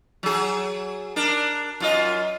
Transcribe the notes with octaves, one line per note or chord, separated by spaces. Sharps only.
F#3 G#4
D4 A#4
F#2 F4 D#5